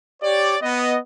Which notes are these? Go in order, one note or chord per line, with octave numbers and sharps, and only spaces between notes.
G4 C#5 D5
B3 D#5